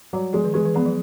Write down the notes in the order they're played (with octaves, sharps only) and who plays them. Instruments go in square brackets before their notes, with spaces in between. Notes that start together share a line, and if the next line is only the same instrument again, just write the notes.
[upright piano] F#3 [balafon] G3
[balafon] F3 [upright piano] G#3
[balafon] D#3
[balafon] E3 [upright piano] G#3
[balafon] E3
[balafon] F3 [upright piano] B3
[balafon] F#3